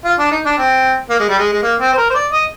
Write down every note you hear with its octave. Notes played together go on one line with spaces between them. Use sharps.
F4
D4
D#4
D4
C4
A#3
G#3
G3
G#3
G#3
A#3
C4
C5
A#4
C5
D5
D#5